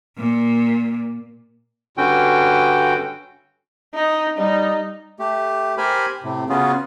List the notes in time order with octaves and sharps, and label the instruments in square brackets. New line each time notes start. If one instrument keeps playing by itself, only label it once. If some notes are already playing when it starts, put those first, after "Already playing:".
[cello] A#2
[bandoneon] G2 D3 C#4 F#4 G5
[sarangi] D#4
[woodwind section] G3 [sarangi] D#4
[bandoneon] A3 G4
G4 A#4 C5 G#5 B5
A2 C3
C#3 B3 C#4 F4 F#4 G#4